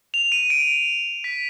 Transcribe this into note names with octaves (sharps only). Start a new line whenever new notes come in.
F7
D#7
D7
B6